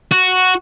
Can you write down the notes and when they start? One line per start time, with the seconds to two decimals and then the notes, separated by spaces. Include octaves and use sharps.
0.12 F#4